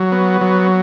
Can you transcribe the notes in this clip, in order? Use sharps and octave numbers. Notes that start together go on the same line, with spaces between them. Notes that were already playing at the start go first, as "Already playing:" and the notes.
Already playing: F#3
B3
F#3